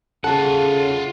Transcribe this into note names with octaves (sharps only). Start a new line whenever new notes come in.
C#3 F4 A4 F#5